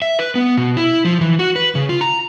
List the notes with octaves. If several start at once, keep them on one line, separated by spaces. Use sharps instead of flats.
E5
B4
B3
B2
E4
F3
E3
F#4
B4
C#3
F4
A#5